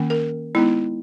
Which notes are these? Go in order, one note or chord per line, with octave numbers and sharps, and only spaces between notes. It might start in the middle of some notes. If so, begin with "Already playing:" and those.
Already playing: D#3 A#3 C#4
A#4
G#3 B3 D#4 E4